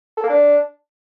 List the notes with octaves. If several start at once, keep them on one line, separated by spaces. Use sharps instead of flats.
A4
A#3
D4